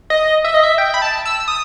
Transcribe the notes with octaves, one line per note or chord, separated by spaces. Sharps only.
D#5
E5
D#5
E5
G5
B5
A5
E6
D#6